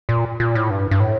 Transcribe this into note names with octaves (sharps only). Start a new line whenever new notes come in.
A#2
A#2
A2
G2
G2
A2